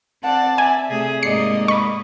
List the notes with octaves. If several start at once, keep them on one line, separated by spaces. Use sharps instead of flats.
C4 D5 F#5 A5
E5 G#5
C3 A3 G#4
G#2 G#3 A#3 D5 D#5 C7 C#7
D#5 B5 C#6